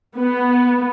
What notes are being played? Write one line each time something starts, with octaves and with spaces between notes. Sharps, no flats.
B3